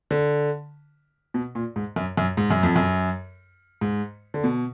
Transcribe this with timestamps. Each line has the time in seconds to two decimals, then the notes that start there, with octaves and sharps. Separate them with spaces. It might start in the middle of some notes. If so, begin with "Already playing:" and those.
0.11 D3
1.34 B2
1.55 A#2
1.76 G#2
1.96 F#2
2.17 F#2
2.37 G#2
2.51 F#2
2.63 F2
2.76 F#2
3.81 G#2
4.34 D3
4.44 B2